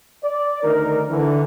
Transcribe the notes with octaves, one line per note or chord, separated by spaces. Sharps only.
D5
D2 D#3 D#4 A#4
D3 E3